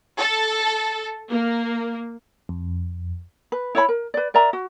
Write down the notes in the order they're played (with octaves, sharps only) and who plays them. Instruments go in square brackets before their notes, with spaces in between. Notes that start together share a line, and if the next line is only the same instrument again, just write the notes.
[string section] A4
A#3
[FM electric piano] F2
[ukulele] B4
E4 C#5 D5 B5
A#4
B4 D5
A#4 D5 E5 A#5
F#4